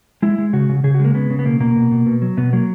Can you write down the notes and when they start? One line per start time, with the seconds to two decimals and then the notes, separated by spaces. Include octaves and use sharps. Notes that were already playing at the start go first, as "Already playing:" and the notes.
0.22 G#3 E4
0.38 G#3
0.53 C#3 F#4
0.69 C#3
0.84 C#3 G#4
0.94 F#4
0.99 G#3
1.05 A#3
1.15 C#3 B3
1.30 C#3
1.39 B3
1.45 B2 A#3
1.60 B2 A#3
1.76 B2
1.91 B2
2.06 B2
2.22 F#3
2.37 B2 B3
2.53 F#3 A#3